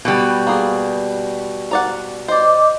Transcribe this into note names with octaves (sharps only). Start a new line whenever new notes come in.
B2 G3
A#3 G#4
A#4 D5 F#5
C5 D5 D#5 D6